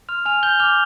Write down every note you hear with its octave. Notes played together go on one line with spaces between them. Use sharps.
C6 F6 F7
G#5 F6 F7
G6 G7
D6 F6 F7